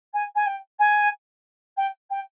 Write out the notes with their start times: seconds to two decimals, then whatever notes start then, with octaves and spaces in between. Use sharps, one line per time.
0.13 G#5
0.35 G#5
0.46 G5
0.79 G#5
1.77 G5
2.10 G5